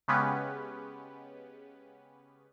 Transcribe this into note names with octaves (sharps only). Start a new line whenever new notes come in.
C#3 G#3 B3 C#4 G4 B4